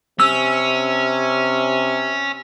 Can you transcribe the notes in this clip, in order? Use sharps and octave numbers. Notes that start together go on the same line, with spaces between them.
C3 C#4 E6